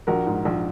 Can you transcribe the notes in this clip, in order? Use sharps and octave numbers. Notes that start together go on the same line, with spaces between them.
A#1 F#4 A#4
G#2
A#1